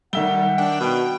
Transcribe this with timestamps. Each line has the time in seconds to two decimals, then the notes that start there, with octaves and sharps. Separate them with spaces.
0.13 D#3 G3 E5 F#5 G7
0.58 D4 G5
0.80 B2